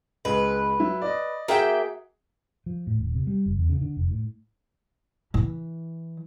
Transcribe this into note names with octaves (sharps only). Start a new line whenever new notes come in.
C#2 G#3 B4
F#3 E4
D5 D#5
A#3 F#4 G#4 E5 F#5 G5
F3
A2
D#1
C3
G3
F#1
E2
C#3
D3
F1
A2
E3